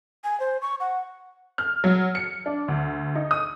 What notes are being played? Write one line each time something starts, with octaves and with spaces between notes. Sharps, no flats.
G#5
C5
C#6
F#5
F6
F#3
C#7
D4
D2
D#4
D#6